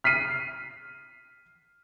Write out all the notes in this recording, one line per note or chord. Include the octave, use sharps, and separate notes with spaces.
F6 B6 C7 D#7